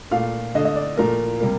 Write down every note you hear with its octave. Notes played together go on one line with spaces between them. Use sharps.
A#2 A3 F5
D3 A3 D#5
D#5
D5
A#2 F3 A3 A#4
C3 G3 A#3